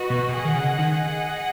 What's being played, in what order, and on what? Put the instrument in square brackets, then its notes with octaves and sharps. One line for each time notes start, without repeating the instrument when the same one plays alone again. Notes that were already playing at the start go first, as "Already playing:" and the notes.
Already playing: [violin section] F#4 B4 D#5
[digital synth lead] B2
[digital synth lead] B2 [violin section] G#4 D#5 F#5
[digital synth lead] D#3
C#3
D#3
[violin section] G#4 D#5 F#5